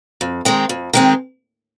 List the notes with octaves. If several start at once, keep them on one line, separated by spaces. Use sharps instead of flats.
F2
D#3 G#3 C4
F2
D#3 G#3 C4